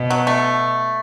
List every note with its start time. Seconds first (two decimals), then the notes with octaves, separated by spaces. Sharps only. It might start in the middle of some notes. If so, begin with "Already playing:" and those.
Already playing: B2
0.10 F#3
0.27 A3